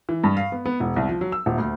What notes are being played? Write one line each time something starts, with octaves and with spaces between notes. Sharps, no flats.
E3
G2
F5
B3
B3
E1
C2
F3
F#3
E6
D#1
D2